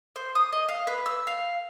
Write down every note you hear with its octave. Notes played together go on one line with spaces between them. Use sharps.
C5
D#6
D#5
F5
B4
E6
F5